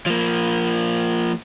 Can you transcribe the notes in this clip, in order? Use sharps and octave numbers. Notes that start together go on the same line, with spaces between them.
F3 A#3